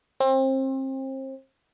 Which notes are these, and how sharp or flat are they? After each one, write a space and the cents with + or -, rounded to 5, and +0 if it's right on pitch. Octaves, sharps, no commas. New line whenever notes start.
C4 +30